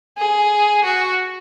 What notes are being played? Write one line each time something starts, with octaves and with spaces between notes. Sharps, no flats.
G#4
F#4